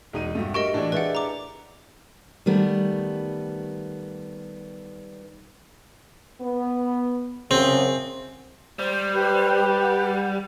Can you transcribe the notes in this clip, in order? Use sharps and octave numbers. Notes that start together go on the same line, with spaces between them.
E1 D#4 D#7
G2 A3 F#4
G4 A#4 D#5 C#6 D7
A2 E3 D4
E4 G4 G#4 B4 D5 F#5
A#5 D6
D#3 G3 A3 B3
B3
F#2 C#3 C4 G#4
G3 C5
G4 B4
F#5